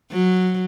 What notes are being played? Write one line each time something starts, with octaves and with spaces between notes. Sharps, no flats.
F#3